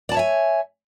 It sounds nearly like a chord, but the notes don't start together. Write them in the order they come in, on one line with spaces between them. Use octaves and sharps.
D5 A5 C#5 E5 G#5